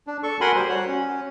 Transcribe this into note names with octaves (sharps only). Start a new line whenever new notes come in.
D4
A4 C#6
F#4 A#4 F#5 G#5 B5 C6
G3 C5
F#4 C#5
C#4